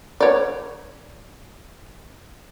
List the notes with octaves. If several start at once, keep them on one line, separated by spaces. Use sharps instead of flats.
C#5 D5